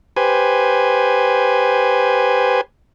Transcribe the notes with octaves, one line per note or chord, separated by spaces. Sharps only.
G4 B4 C5 G#5